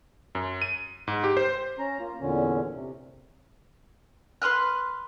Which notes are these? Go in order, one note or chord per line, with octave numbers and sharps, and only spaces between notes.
F#2
D#7
G#2
G4
C5
C#4 A#5
A#3 F4
E2 A#2 D3 C#4
C3
B4 C6 F6 F#6